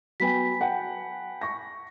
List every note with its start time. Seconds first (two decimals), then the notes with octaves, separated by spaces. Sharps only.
0.20 F#3 B3 G5 G#5 B5 B6
0.61 F#5 G5 A5
1.41 C#6 A#6